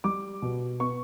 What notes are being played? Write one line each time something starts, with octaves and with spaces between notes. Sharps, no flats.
G3 D6
B2
B3 C#6